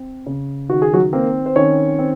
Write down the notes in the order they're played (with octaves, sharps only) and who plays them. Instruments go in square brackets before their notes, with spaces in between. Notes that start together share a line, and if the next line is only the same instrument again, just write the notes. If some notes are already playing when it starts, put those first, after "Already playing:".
Already playing: [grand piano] C4
C#3
D#3 F#4
G#4
F#3 F#4
A#3 C4 A#4
C5
D#3 C#4 C#5
C4